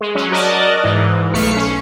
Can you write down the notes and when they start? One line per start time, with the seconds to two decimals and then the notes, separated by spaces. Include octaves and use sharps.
0.01 G#3
0.15 F#3 C#4
0.31 F#4 A#4 D5 D#5 A5
0.84 G#2 E3
1.34 B1 A3 F5 B6 C#7
1.57 C#4